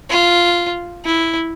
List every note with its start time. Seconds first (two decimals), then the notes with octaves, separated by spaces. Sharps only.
0.10 F4
1.06 E4